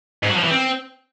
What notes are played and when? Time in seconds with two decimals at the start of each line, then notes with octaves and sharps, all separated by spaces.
0.23 G#2
0.30 F#3
0.37 F3
0.44 E3
0.51 C4